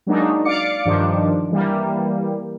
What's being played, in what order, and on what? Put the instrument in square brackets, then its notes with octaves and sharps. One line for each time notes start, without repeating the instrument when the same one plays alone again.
[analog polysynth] F#3 G#3 A#3 D4 D#4
D5 F5 D6 C#7
G2 D#3 F3 D4
E3 G3 A#3